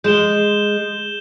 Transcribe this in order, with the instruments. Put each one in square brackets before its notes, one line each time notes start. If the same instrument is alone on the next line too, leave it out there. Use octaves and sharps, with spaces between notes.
[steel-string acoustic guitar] G#3 [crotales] G6 E7 G7